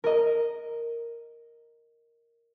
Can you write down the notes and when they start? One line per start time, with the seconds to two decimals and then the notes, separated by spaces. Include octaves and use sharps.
0.04 A#4 D#5